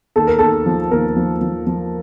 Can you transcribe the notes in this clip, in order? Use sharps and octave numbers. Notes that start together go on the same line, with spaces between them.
D#2 A4
A#4
D#2 A4
F3
D#2 A#4
F3
F3
F3